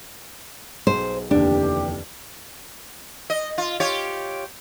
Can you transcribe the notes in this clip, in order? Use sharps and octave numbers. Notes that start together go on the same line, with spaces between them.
B1 G#4 C5
F1 D#2 D3 E3 D4 G4
D#5
F4
F4 G4 C#5